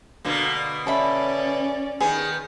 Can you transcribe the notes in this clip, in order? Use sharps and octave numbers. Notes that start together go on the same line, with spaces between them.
B2 D3 A#3
C#4 A4 D5 E5 B5
D#3 B3 G#4